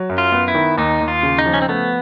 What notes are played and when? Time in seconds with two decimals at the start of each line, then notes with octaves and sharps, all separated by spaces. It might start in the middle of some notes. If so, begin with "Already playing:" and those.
Already playing: F#3
0.10 F#2
0.18 F4
0.32 B3
0.48 E4
0.55 D#3
0.78 D#2 D#4
1.01 D#2
1.08 F4
1.23 C#3
1.39 D#4
1.46 F3
1.54 C#4
1.62 C4
1.69 A3 B3